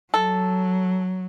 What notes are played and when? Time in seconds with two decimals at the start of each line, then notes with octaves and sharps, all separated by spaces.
0.14 F#3 A4